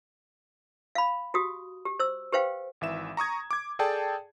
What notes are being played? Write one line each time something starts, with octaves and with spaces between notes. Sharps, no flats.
F5 B5
F#4 G4 D#6
G4
C5 E6
G4 B4 C5 F5 G5
G#1 E3 E5 E7
A#5 C#6 D#6 G#6
D6 G#6
G#4 A4 D5 G5 A5